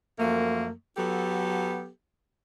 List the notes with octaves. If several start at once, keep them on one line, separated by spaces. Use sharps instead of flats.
F#2 F3 A3 A#3
F#3 B3 G4 A4